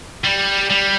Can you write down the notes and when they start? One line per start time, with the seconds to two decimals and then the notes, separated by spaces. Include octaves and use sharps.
0.24 G3
0.70 G3